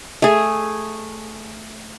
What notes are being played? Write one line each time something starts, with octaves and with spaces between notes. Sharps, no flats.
A3 G#4